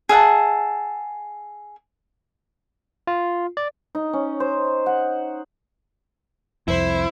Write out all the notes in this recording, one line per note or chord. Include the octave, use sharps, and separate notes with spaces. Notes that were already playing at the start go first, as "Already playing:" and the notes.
G#4 E5 F#5 A5
F4
D5
D#4
C#4
C5
F#5
C2 F2 E4 C5